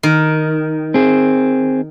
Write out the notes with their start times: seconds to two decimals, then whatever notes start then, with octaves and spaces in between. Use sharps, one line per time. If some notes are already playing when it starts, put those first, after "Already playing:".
0.03 D#3
0.94 C4 G#4